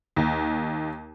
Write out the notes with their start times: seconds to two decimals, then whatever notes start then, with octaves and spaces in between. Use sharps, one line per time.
0.16 D#2